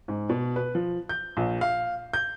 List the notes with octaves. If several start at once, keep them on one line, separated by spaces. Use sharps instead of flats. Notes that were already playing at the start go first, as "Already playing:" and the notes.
G#2
B2
B4
F3
G6
A#1
F5
G6